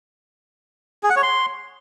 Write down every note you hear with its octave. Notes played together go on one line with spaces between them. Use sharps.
G#4
F#5
C#5
C6